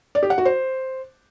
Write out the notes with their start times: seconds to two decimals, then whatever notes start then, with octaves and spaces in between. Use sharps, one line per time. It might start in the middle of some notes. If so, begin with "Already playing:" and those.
0.15 D5
0.23 G4
0.30 F#5
0.38 F#4
0.45 C5